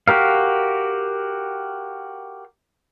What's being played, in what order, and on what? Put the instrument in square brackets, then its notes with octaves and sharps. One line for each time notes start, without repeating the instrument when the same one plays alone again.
[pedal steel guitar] F#4 G4 A#4 F5